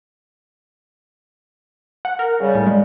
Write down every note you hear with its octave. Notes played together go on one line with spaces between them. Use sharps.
F#5
A#4
C#3 G3
A2
G#3